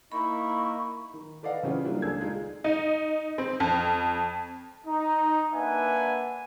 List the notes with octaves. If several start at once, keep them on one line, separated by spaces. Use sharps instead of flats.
A#3 D#4 E4 B5 C#6
D#3
A4 B4 D5 D#5 F5 F#5
C#3 E3 C4 C#4 F4 G4
F#3 G3 A#3 D4 E4 F4
C#2 D4 G#4 A4 E6 G#6
G#3 D#4 F4
D#4
C4
F2
D#4
A#3 D4 B4 E5 F#5 G#5